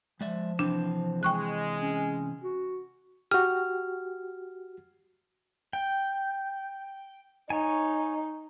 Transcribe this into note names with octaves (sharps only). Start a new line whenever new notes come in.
F3 G#3 D5 E5
C3 E3 C4 D4
G#3 G5 C#6 F#6
C#4
F#4
F#4 G4 F6
G5
D#4 C#5 G#5